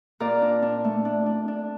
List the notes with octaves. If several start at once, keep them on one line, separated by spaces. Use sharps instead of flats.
A#2 A#4 D5
D4
D4
A3
D4
D4
D4